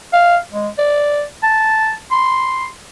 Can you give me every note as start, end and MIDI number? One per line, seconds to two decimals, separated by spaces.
0.13 0.37 77
0.52 0.69 56
0.78 1.23 74
1.43 1.95 81
2.11 2.67 84